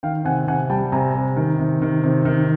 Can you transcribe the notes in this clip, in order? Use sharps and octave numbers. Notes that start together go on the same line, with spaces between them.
D#3 F5 G5
C3 F#5 G#5
C3 F#5 G#5
G3 G5 A5
C3 G#5 A#5
C3
D#3
C3
D#3
C3
D#3